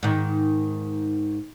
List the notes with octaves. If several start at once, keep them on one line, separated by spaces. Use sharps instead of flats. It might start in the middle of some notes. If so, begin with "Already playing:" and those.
G#2 D#3